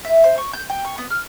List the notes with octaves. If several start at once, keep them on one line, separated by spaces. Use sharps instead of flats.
E5
C5
C#6
G6
G5
C#6
B3
F6